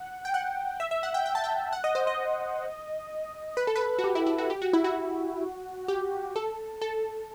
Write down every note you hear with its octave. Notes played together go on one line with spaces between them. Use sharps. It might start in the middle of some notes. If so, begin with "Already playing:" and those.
Already playing: F#5
G5
F#5
E5
E5
F#5
G5
G5
A5
G5
F#5
D#5
C5
D#5
B4
A4
B4
F#4
G4
E4
E4
F#4
G4
F#4
E4
F#4
G4
A4
A4